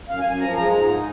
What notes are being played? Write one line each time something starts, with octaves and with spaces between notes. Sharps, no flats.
F#2 F5
G#5
F#2
G#5
F3 A#5
G#3 A#5
G#2 A#5
D#4